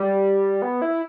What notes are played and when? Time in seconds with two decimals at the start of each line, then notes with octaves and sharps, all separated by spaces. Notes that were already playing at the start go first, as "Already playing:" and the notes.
Already playing: G3
0.62 B3
0.82 E4